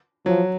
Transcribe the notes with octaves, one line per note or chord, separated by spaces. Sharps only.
F3 F#3